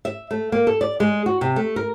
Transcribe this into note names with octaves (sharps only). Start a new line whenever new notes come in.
E5
A3
A#3
A4
D5
G#3
F#4
C3
A3
A#4